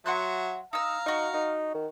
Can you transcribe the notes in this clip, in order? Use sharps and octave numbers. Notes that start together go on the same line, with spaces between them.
F#3 E5 F#5 C6 F#6
D#4 F5 A#5 E6
D#4 F#4 C#6
D#4
D#3